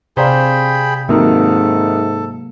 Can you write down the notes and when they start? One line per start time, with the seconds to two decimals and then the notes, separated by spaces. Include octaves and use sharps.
0.17 C3 G#4 C5 D5 F5 G5 A#5 B5
1.09 G#2 C3 D#3 F#3 A#3 A4